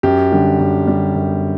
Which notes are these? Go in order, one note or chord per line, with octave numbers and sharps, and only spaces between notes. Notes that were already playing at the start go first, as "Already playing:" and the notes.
F#2 G4
D3 G3
F#2
D3 G3
F#2